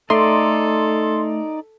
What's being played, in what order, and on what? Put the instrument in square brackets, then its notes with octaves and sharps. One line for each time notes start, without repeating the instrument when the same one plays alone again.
[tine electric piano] A3 [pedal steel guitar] D#4 D5 [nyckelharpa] A4 [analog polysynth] C6